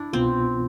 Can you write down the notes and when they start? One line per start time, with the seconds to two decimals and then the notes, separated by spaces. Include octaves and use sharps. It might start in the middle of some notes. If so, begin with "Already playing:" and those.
Already playing: D4 E4
0.13 C2 B2 B3 C4 F4